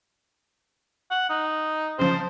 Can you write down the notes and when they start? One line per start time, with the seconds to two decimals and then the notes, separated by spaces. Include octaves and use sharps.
1.11 F#5
1.30 D#4
1.99 C#3 F3 C5